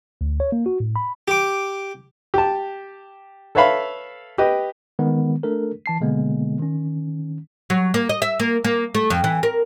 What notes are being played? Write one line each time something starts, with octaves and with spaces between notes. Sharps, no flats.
D2
C#5
A#3
F#4
A2
B5
G4 D6
G4 A5
A4 B4 C#5 E5 F5 B5
G4 B4 D#5
D#3 G#3 B3
A3 D4 A4 A#4
E3 A5 C7
B2 D3 G#3 A#3 B3
D#3 C#4
F#3
A#3
D#5
E5
A#3
A#3
A3
F2
E3
A#4